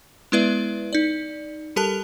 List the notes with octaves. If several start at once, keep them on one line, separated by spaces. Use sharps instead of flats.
G#3 B3 E4 B4 D5 E5
D#4 D5
G3 G4 A4 A#4 A5 F#6